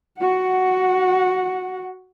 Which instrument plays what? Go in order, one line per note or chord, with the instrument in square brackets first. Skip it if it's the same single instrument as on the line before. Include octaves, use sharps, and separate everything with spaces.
[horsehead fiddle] F#4 F#5